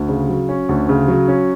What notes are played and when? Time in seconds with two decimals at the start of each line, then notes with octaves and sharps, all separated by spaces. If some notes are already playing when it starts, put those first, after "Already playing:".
Already playing: D2
0.09 C#3
0.29 F#3
0.49 C#4
0.69 D2
0.89 C#3
1.08 F#3
1.28 C#4